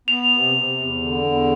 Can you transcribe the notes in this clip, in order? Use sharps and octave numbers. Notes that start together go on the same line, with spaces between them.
B3 F7
C3
C3
E2
D3
E2